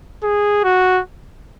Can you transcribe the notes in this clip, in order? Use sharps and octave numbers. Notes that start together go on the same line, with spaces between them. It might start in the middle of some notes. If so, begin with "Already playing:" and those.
G#4
F#4